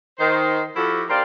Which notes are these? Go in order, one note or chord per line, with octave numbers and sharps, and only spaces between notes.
D#3 C5
F3 E4 F#4 G4 A4
D#2 G4 A#4 C5 D5 F5